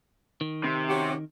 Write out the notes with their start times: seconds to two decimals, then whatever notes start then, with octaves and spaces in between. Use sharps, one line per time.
0.41 D#3
0.64 C3
0.88 C#4 F#4 G4